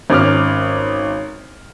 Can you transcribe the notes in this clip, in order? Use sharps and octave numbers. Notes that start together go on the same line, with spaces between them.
G#1 C#4 D6 F6